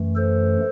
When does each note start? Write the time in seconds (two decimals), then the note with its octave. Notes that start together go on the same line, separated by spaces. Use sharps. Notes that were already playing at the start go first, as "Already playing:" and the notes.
Already playing: F#2 E3 A3
0.16 A4 C5